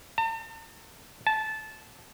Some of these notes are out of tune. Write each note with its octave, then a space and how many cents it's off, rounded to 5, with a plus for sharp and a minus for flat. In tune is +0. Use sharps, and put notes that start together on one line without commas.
A5 +45
A5 -15